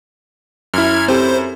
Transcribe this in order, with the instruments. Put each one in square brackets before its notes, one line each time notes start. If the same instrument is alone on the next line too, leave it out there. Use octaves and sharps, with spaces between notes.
[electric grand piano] F#2 E4 [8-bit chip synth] F6 G#6
[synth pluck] C4 G4 A4 [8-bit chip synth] C5